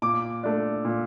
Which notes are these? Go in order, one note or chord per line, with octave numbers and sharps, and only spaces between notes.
A#2 D6
A3 D4
A#2